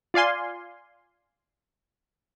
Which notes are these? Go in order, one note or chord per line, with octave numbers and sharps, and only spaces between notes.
F4 D5 F5 G#5 C6